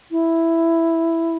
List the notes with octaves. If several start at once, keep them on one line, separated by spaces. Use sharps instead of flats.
E4